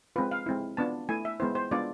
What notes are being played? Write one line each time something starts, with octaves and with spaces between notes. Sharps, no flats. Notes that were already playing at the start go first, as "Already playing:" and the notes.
G#3 C4 F4 B4
F5
G#3 C4 E4
B3 D4 F4 A5
A3 E4 G#5
E5
G#3 B3 E4 C5
C5
G#3 B3 D4 F4 D5